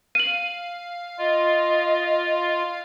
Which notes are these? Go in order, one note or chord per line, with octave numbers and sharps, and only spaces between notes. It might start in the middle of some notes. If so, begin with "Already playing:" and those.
F5 D#7 F#7
F4 D#5